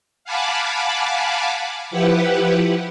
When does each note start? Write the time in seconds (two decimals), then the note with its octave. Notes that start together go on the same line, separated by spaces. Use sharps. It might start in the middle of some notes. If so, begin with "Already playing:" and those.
0.24 F5 F#5 G#5 A5 B5 D6
1.91 F3 E4 G4 B4 F#5